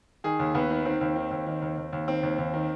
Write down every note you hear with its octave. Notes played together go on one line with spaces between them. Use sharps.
D#3 G#4
D#2
D#2 B3
D#3
D#3 C4
D#2
D#3
D#2
D#3
D#2
D#2
D#2
D#3 C4
D#2
D#2
D#3